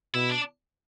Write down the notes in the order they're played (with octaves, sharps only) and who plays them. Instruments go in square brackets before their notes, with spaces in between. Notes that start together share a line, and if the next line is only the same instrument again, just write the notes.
[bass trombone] B2 [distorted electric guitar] E4
[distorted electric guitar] D4